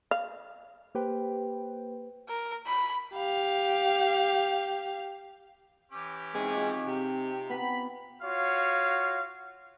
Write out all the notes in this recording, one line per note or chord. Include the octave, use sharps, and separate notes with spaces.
F5
A#3 G4 B4 C5 G5
A#4
B5
G4 F5
E3 C#4 G4
G#3 C4 D#4 E4
F4 G#4
C3
B3 G4 A#5 B5
F4 F#4 C#5 F5